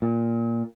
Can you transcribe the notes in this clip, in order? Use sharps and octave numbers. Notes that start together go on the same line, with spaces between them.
A#2